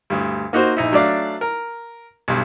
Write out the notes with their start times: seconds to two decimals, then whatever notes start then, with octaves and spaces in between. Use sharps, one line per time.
0.10 D2 G2
0.53 A#3 D#4 F#4 C5
0.77 A#1 D#4 E4
0.92 F#3 A3 D4 D5 F5
1.41 A#4
2.28 B1 G2